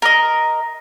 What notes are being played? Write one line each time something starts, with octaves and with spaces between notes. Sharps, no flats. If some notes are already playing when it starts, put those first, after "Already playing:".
A#4 D#5